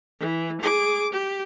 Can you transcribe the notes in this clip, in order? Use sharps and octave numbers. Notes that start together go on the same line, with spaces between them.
E3
G#4 D6
G4